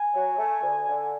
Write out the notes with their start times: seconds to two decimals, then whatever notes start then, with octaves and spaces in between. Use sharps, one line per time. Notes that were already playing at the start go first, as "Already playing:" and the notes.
Already playing: G#5
0.13 F#3
0.38 A3
0.62 D2
0.87 D3